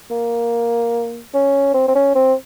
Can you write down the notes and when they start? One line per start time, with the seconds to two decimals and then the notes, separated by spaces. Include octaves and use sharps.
0.10 A#3
1.34 C#4
1.74 C4
1.88 C4
1.95 C#4
2.15 C4